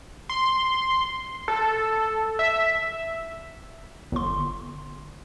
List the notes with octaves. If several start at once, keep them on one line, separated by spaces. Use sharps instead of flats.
C6
A4
E5
G1 C6